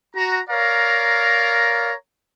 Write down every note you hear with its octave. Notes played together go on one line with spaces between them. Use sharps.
F#4 A#5
A#4 C#5 D5 F5 A#5